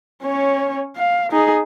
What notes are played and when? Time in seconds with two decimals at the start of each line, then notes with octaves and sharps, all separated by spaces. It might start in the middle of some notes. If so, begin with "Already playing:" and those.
0.23 C#4 C#5
0.96 F5
1.32 D#4 G#4